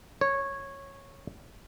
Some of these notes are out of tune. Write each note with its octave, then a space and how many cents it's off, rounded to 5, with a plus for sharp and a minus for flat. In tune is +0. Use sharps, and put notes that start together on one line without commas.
C#5 -10